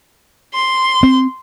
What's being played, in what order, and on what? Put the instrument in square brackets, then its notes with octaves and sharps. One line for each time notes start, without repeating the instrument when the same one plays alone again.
[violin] C6
[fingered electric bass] C4